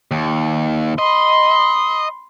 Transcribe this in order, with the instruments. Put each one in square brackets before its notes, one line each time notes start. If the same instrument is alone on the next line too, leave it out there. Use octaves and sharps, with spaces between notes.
[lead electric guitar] D#2
[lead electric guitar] D#5 [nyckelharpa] B5 C6